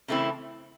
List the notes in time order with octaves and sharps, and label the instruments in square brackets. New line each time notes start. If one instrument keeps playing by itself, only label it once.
[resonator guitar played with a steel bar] C#3 E3 A3 C4 E4